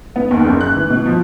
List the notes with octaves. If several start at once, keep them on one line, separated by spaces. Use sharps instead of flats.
B3
D#2
F#1
F#6
E3
B2
F3